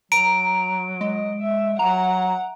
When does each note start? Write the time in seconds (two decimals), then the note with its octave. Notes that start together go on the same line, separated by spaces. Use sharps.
0.12 F#3 A#5 D7
1.01 G#3 D#5
1.41 E5
1.79 F#3 F#5 A#5